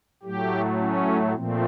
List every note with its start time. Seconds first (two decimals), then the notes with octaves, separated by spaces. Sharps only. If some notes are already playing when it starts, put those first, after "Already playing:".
0.23 A2 F#3 A3 G4
0.79 C#4
1.34 A#2 F3 A3 C4